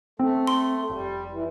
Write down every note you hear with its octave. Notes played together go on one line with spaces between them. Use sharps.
A3 C4
C6
F1 G3
E3